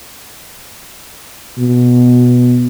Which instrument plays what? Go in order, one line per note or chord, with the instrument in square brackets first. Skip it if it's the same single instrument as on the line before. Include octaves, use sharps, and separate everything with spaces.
[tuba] B2